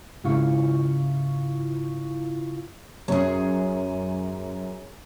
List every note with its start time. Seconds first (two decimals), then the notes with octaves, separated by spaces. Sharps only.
0.24 G#2 C#3 E4 F4 F5 C#6
3.08 F#2 G#4 C#5